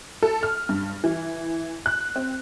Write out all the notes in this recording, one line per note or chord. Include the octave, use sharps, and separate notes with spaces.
A4
F6
G2
E3
F#6
C4